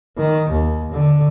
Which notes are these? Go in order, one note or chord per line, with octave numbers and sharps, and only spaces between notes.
D#3
D#2
D3